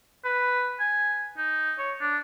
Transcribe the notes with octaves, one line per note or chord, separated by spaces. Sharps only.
B4
G#5
D#4
C#5
D4